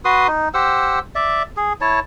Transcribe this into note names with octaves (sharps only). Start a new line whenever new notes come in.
F#4 B4 C6 D#6
D#4
G4 C5 F#5 E6
D5 E5
G#4
E4 C#5 A5